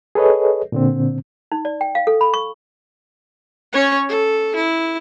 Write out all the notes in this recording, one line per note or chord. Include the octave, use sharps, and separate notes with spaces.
G#4 A4 B4 C#5 D#5
A#2 D3 C4
D#4
D5
G5
F5
A4
B5
C#6
C#4 C#5
A4
E4